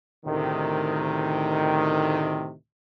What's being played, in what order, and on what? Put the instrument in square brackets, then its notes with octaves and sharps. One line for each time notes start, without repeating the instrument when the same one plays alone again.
[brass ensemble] D2 A2 C3 D#3